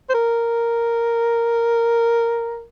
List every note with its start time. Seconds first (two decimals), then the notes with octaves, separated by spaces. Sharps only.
0.09 C5
0.14 A#4